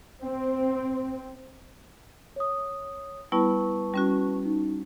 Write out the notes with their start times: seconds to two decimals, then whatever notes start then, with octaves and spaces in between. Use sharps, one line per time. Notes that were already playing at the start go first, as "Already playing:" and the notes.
0.22 C4
2.36 C#5 D#6
3.32 G3 B3 E4 B4 A5 C#6
3.94 G3 C#4 F#4
4.45 D#4